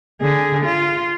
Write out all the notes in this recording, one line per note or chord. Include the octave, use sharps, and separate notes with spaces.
D3 G#4
F4